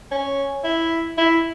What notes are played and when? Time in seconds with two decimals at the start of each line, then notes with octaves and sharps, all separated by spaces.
0.11 C#4
0.64 E4
1.18 E4